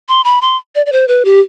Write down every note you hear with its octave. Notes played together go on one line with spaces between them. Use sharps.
C6
B5
C6
D5
D5
C5
B4
G4